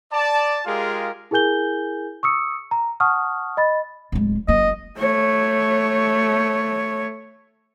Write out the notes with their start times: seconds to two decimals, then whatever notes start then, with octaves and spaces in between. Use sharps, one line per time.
0.12 D5 A5
0.66 G#3 F4 G4 G#4 A#4 F5
1.31 E4 G#4 A#4 G#5 G6 G7
2.23 C#6 D#6 E6 C#7
2.71 A#5
3.00 F#5 A5 C#6 D#6 F6
3.57 D#5 B5 A6
4.12 D1 G#3
4.48 F#1 A#3 D#5
4.98 A3 C#5